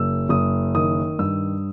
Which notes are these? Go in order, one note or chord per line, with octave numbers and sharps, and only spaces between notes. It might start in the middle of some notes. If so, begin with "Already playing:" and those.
Already playing: F#1 E6
F#1 D#6
D#3 D#6
G2 E6